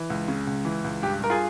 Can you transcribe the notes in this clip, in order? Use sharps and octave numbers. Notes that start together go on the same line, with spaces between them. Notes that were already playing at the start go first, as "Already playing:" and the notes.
Already playing: E3
C#2
C#3
C#2
E3
C#2
G2 G4
G2 A#4
F4 G#4